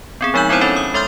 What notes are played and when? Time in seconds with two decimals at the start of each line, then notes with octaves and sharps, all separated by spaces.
0.21 B3 C4 G#4
0.34 F3 G#3 D#4 E6 G6 F#7
0.49 B3 C4 D#4 E4 C5 C#5
0.61 C#4 A4 C#5 E5 B5
0.76 D#6
0.94 G#3 A4 E5 C6 F6 G6